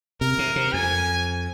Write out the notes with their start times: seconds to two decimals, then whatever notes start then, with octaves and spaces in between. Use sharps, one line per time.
0.21 C3 A#4
0.39 C3
0.56 C3
0.73 F2 G#5